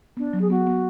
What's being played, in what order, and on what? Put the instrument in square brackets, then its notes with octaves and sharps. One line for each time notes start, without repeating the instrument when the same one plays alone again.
[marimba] B3 [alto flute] D4
[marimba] F#3
[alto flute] G#4
[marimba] B3 [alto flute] F#4
[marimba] B3